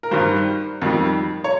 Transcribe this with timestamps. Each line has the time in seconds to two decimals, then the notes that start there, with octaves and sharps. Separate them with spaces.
0.03 A#4
0.11 G2 D#3 G3 C5
0.82 F2 D#3 G3
1.44 C#5